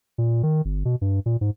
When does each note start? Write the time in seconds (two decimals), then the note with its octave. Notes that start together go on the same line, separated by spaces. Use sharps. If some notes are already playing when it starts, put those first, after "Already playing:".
0.18 A#2
0.43 D#3
0.65 G1
0.85 B2
1.01 G2
1.26 A#2
1.41 G#2